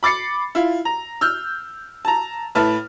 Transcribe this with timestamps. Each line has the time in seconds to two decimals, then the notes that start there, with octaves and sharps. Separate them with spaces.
0.03 B5 D6 A6 C7 C#7
0.55 E4 F4
0.85 A#5
1.21 E6 F6 G6
2.05 A5 A#5
2.55 A2 E4 B4 A5 F6